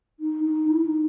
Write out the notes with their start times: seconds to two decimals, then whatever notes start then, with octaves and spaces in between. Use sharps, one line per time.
0.20 D#4
0.44 D#4
0.69 E4
0.85 D#4